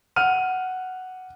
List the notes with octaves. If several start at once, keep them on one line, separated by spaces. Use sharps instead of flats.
F#5 F6 D#7